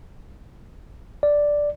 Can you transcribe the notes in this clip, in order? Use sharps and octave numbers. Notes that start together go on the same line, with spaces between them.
D5